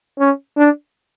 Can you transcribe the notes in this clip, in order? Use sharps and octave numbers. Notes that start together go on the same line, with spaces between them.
C#4
D4